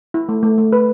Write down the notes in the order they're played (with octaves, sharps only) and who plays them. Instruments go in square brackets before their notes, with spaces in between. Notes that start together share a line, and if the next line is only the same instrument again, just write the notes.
[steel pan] E4
A3
A3
A3
B4